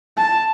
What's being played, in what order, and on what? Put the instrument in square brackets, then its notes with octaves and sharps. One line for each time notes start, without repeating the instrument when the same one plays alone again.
[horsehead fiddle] A5